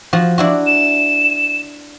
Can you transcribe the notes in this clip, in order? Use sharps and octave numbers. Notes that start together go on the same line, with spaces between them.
F3 F#4
D4 E4 F#4
E7